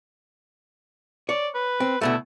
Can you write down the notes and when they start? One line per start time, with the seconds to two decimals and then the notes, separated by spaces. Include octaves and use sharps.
1.29 C#5 D5
1.54 B4
1.80 C4
2.01 D2 B2 A3 E4